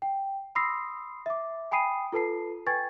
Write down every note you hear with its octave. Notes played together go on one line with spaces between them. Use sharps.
G5
B5 C6 D#6 E6 A#6 C7
E5 D6
G5 G#5 B5 D#6 C7 D#7
F4 A4 B4 A5 C7
B4 G5 G#5 C#6 G#6 A6